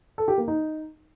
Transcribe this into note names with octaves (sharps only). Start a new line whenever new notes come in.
A4
G4
A#3
D#4